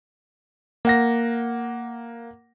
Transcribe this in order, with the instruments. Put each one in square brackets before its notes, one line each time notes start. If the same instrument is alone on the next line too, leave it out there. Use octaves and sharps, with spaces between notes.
[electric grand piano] A#3 F#5 A#6